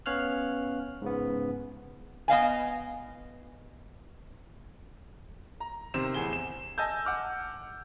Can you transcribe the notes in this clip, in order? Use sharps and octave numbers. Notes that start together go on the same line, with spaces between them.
B3 C#4 C#5 F5 F6 F#6
G#2 C#3 B3
B3 D#5 F5 G#5
A#5
C3 D#3 C4 C5 E7
E2 A2 G#4 G7
E7
D#5 G#5 A5 E6 G6
F#5 D6 F6